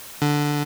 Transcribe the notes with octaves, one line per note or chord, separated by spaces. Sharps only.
D3